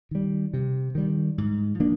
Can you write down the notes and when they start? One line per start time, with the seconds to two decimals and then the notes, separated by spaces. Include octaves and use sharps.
0.11 D#3 G3
0.54 C3
0.95 D#3 G3
1.38 G#2
1.80 F3 A#3 D4